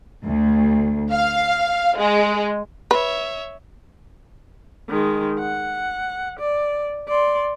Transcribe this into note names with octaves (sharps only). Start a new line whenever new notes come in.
D2
F5
G#3
B4 C#5 E5
D#3 G#3
F#5
D5
D5 C6